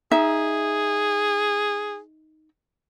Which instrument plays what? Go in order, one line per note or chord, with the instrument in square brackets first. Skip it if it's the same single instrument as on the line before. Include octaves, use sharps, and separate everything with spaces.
[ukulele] D#4 E5 [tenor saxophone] G#4